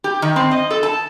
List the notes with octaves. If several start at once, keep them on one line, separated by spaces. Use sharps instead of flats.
G4
D#3
C4
D#5
A4
A5